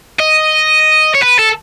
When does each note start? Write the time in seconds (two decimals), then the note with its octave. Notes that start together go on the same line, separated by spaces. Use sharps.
0.20 D#5
1.14 C#5
1.22 B4
1.39 A4